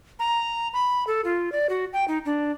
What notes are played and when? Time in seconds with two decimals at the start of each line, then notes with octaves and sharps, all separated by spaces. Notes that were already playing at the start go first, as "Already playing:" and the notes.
0.19 A#5
0.73 B5
1.07 A4
1.25 F4
1.52 D5
1.69 F#4
1.93 G5
2.08 D#4
2.25 D4